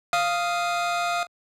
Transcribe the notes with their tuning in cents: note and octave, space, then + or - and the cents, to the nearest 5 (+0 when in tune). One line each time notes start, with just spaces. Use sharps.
F5 -5 D#6 +0